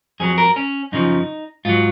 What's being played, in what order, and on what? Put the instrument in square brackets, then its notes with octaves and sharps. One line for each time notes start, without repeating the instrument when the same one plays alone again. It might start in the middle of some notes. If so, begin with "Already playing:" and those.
[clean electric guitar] F2 D#3 F#3 G#4
A#4
C#4
F#2 C#3 F3 D#4
G#2 F#3 F4